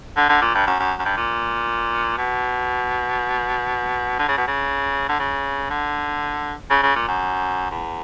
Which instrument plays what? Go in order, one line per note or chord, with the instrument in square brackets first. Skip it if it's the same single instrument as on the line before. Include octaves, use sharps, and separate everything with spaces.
[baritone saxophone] D3
D3
A#2
G2
F#2
F#2
F#2
G2
A#2
B2
D3
C#3
B2
C#3
D3
C#3
D3
C#3
C#3
A#2
F#2
E2